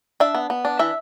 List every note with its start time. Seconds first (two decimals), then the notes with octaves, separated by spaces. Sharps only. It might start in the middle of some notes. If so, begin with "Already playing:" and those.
0.20 D4 E5
0.35 B3
0.50 B3
0.65 D4
0.79 E3 E5